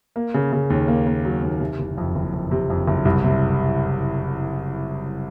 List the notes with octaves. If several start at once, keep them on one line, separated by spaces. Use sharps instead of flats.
A#3
C#3
C#3
D#2
A#3
A#3
F#3
D#2
C3
F#1
F2
F#1
F2
C3
F2
F#1
C2
C3